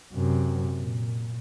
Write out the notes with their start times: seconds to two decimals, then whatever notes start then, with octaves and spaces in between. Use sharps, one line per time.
0.13 F#2 C3
0.78 A#2